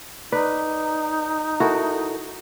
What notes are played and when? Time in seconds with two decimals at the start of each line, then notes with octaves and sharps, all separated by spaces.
0.32 D#4 B4 D5
1.60 E4 F#4 A4 A#4